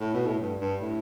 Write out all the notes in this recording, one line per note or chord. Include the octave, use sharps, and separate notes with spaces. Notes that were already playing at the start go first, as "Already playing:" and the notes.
A2
B2
A2
G2
G2
A2